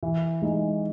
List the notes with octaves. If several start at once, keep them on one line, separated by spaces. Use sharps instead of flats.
E3
G#3 D#4